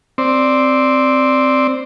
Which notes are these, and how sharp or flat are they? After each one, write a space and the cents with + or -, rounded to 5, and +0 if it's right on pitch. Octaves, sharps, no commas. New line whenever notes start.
C4 +0 D5 +0